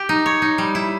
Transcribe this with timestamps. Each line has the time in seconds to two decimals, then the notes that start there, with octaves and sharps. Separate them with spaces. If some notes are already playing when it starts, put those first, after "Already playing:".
Already playing: G4
0.09 D#4
0.26 C#5
0.42 D#4
0.58 G3
0.75 E4